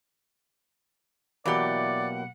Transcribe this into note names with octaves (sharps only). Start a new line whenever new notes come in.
B2 E3 F#3 A#3 G4 D5 F#5